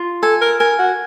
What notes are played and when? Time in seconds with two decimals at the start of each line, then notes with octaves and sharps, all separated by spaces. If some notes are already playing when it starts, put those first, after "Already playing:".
Already playing: F4
0.23 A4 G#5
0.42 A#4
0.60 A#4 G#5
0.79 F#4